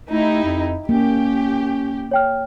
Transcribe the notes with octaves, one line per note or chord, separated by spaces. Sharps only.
A3 D#4 E4 G4
F2
A#3 C#4 G4
C#5 G5 F6